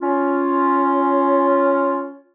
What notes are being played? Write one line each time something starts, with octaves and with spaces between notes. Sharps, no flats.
C#4 F4